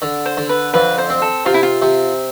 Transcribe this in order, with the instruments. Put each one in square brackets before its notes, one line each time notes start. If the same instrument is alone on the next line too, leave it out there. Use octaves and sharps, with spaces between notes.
[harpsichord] D3
[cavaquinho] C5
[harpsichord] D3
[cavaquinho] B4
[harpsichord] F2 [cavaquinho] B4
[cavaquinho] C5
[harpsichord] C4
[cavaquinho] A4
[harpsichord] C3 [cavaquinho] F4
[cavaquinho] E4
F4
[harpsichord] C3